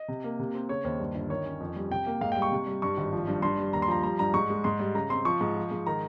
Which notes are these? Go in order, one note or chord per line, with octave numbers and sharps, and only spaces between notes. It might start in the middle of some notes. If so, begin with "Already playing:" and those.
Already playing: D#5
C3
A#3
C3
C4
C#3 C#5
D#2 C5
G2
G1
D#3 C#5
C#4
F2
G3
C3 G5
A#3
G#2 F5
G5
G3
C#6
C3
G3
G2 C#6
G#1
F3
G2
G2 C6
G3
D#2 A#5
C6
F3 A#5
G3 A#5
G2 A#5
G#2 C#6
G#3
G#2 C6
G3
C#3 A#5
C4 C6
F3 C#6
G#2
F3
G#2
D#3 A#5